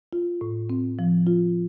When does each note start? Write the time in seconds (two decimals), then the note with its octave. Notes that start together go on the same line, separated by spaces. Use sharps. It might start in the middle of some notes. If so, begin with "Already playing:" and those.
0.13 F4
0.41 A2
0.70 C4
0.99 F3
1.27 F4